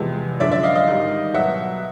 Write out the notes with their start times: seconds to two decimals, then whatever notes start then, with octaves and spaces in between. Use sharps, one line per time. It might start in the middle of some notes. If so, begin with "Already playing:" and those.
Already playing: E2 C3 F3 G#3
0.40 F#2 D3 F3 G#3 D5 E5
0.51 D5 E5
0.63 D#5 F5
0.75 D#5 F5
0.87 G#2 D#3 G3
1.34 B2 F#3 E5 F#5